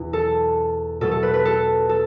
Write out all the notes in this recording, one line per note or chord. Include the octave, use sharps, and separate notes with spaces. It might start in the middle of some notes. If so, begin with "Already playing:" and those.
Already playing: E2 B2
A4
B2 A3 A4
A4
B4
B4
A4
A4